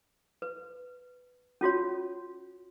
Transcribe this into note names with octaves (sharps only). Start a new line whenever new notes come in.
B4
C#4 F4 F#4 C#5